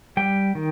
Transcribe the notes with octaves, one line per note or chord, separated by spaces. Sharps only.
G3 G5
D#3